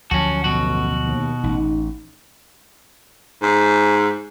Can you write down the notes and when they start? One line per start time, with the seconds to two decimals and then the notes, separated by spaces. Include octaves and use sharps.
0.11 D2 F3 F#3 C#4 F#4 A5
0.44 A1 B2 F#4
1.05 D#2
1.43 A1 D#4
3.42 G#2